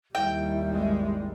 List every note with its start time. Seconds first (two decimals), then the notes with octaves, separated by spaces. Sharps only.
0.15 D#2 G3 E4 G5
0.68 G#1 G#3